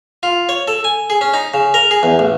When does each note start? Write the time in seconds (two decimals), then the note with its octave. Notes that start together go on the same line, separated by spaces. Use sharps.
0.23 F4
0.49 C#5
0.68 A4
0.84 G#5
1.10 G#4
1.21 C#4
1.34 D#4
1.54 C#3
1.74 A#4
1.91 G#4
2.03 E2
2.19 A1